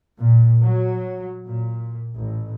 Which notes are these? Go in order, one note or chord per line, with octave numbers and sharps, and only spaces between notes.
A#2
F#3
A#2
A1